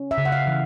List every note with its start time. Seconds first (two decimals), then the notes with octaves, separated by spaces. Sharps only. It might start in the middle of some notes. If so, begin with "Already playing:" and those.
Already playing: C#4
0.11 E5
0.18 C#3
0.25 F#5
0.32 F5
0.47 E3